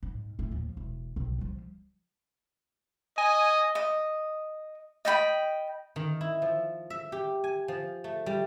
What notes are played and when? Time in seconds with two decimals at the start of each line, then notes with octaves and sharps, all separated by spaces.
0.03 G#2
0.39 A#2 A3
0.51 D#2 F3
0.77 E1
1.16 B1 C3
1.38 F3 G3
3.18 D#5 G#5
3.75 D#5
5.05 D#5 G5 B5
5.96 D#3
6.21 E4
6.42 F3
6.90 E5
7.12 G4
7.44 G#5
7.68 F3
8.04 A3
8.26 G3